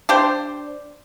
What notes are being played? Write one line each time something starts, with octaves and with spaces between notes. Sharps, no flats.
D4 G4 C5